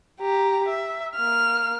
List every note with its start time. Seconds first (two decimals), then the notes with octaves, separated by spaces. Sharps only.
0.20 G4 A#5
0.68 E5
1.15 A#3 F6